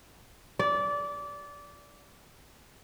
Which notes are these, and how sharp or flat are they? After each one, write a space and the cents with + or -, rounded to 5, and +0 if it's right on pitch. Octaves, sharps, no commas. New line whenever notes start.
D5 -20